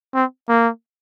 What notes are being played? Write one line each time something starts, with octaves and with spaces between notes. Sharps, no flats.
C4
A#3